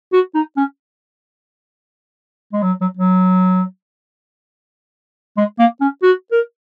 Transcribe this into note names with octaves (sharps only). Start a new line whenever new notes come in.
F#4
D#4
C#4
G#3
F#3
F#3
F#3
G#3
A#3
C#4
F#4
A#4